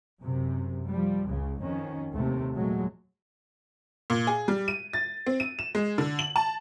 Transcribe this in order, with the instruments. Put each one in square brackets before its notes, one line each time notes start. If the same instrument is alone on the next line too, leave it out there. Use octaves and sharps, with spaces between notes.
[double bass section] F#2 C3
F3 G3
C#2 C#3
F2 D#3 C#4
D#2 C3 A3
A#2 F#3 G#3 A3
[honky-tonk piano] A#2
G#4
G3
D#7
A6
C4
D#7
E7
G#3
D3
F#7
A5